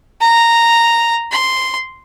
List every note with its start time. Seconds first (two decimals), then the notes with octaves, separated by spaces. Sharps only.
0.21 A#5
1.32 C6